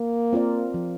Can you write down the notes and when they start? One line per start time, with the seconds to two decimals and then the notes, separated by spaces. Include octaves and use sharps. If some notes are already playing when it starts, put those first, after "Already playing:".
Already playing: A#3
0.33 C4 F4 A#4 D5
0.74 F3